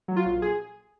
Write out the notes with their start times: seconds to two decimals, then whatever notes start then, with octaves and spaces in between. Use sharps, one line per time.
0.08 F#3
0.16 F4
0.25 A#1
0.42 G#4